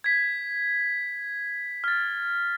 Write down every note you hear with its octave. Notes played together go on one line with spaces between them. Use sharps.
G#6 B6
F6 A6